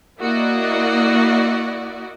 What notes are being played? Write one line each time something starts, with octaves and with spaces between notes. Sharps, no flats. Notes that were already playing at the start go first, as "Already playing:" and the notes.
A#3 E4 F#4 D5 D#5